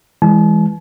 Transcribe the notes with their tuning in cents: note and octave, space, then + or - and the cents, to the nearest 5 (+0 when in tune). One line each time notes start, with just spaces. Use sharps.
E3 -5 G#3 -20 A5 -45